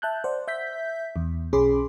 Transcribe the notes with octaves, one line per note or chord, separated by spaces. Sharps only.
E5 A5 F#6 G6
C5 D5 F#5
E5 G6 B6
E2
B1 C#4 G#4 B5 C6 D6